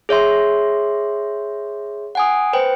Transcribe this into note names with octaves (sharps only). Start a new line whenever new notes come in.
G#4 C#5 E5 C6
F#5 G#5 D#6
B4 C5 G5